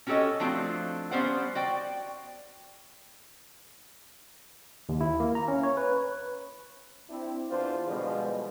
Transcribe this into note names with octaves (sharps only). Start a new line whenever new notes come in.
C#4 F#4 G4 A4 C#5 D#5
F3 A3 C4 D4 F4 F#4
G3 B3 C#4 C5 D5 F#5
F#4 D5 G5
D#2
E4
A#3
A#5
C#4
C#5
B4
C4 D4 E4
E2 D4 F4 B4 C5
B2 D3 E3 F3 G3 G#3